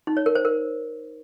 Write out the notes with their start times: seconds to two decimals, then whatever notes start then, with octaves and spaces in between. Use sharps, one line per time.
0.07 D#4
0.17 C#5
0.26 A#4
0.35 C5
0.45 A#4